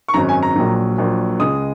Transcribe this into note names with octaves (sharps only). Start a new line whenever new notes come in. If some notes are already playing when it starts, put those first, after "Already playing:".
C#6
G#1 F#2 F#3 A#5
G#5
A#5
A#1 A#2 F#3
A#1 A#2 F#3
C#2 C#3 G#3 D#6